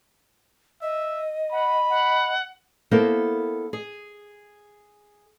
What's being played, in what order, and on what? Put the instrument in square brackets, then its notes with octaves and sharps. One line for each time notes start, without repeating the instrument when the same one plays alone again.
[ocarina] D#5 [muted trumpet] E5
[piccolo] F#5 [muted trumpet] B5
[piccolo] F#5
[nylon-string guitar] A#3 B3 E4 A4 A#4 C5
G#4